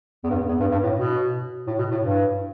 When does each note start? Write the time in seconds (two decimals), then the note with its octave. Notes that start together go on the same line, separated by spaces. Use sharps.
0.24 E2
0.30 G2
0.35 E2
0.48 E2
0.60 G2
0.71 G2
0.83 A2
0.96 B2
1.67 A2
1.79 B2
1.91 A2
2.02 G2